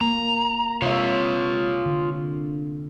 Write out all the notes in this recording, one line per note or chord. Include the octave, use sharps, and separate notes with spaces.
A#3 A#5
C3 F4 C#5 E5 F5
D3